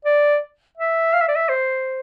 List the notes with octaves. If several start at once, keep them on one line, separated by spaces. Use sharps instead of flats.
D5
E5
F5
E5
D5
E5
C5